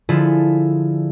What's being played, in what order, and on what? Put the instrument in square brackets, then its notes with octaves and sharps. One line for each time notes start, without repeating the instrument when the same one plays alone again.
[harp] D3 F3 E4 F4 G#4 A4